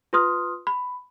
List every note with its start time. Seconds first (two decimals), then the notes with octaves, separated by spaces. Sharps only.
0.13 F4 B4 C6 D#6 F6
0.67 B5